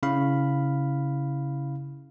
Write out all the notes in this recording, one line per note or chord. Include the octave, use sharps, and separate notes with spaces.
C#3 C#4 E4 F5 B5